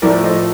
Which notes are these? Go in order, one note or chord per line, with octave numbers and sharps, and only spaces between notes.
A2 F3 A3 A#4 D5
C5 D#5